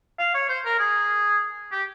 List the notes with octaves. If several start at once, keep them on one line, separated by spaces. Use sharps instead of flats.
F5
C#5
C5
A#4
G#4
G4